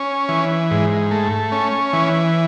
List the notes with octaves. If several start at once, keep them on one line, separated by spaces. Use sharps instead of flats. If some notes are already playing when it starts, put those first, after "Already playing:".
Already playing: C#4
E3
G#2
A3
C#4
E3